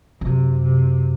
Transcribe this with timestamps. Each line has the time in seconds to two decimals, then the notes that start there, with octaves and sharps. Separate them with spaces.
0.21 F#2 C3
0.62 C3